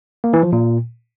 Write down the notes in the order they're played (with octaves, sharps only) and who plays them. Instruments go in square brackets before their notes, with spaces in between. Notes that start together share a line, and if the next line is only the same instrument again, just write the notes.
[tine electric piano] A#3
E3
F3
A#2